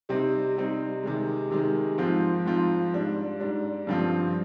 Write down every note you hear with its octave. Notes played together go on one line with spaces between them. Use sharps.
C3 G3 C4 D#4
C3 G3 C4 D#4
C3 D#3 G#3
C3 D#3 G#3
G#2 F3 C4 F4
G#2 F3 C4 F4
G#2 G3 D4
G#2 G3 D4
G2 D3 F3 C4 F4